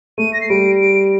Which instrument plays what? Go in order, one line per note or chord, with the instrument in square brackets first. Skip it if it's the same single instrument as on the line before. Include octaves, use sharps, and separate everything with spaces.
[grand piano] A3 [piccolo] D#7
[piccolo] A#6
C7
[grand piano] G3 [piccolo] D7
[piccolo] D7